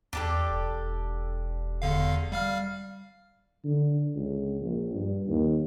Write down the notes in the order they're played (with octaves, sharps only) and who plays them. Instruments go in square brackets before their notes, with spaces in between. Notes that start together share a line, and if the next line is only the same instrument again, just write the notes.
[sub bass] E2 [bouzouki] D4 G4 A4
[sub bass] E1
[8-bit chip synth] E2 D3 F5
G3 F5 F6
[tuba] D3
C#2
A#1
G2
D#2